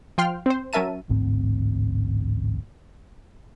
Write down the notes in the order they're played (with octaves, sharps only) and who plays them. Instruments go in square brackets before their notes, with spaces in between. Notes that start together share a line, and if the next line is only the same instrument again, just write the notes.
[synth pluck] F3 F4 G5 C6 F6
C4 C5
F#3 C#4 A#4 E5 A5 D#7
[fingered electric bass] A1 D2 G#2 C4